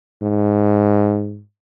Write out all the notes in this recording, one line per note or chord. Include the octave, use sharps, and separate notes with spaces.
G#2